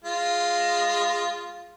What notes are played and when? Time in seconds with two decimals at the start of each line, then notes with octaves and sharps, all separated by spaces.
0.04 G#3 F4